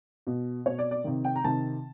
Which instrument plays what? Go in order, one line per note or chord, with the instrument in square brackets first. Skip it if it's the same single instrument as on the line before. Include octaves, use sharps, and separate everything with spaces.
[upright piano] B2
B2 C#5
D5
D5
C3 D#3
G5
A#5
C3 D#3 A5